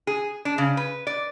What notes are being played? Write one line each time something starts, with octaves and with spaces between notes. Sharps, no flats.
G#4
D4
C#3
B4
D5